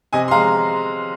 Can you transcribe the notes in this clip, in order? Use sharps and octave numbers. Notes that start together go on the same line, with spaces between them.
C3 D#5 G#5
C6
G#3 F5 A#5